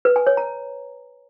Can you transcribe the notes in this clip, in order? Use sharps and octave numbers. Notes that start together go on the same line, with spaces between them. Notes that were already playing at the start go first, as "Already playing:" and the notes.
B4
G#5
C#5
A#5